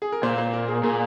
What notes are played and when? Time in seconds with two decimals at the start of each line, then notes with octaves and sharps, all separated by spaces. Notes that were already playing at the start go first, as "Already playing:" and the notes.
0.02 G#4
0.12 A#4
0.23 A#2 C5
0.38 C5
0.53 A#4
0.68 G#4
0.83 A#2 G#4